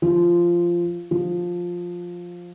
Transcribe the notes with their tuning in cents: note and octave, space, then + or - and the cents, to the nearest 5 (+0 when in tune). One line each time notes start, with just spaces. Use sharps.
F3 -10
F3 +10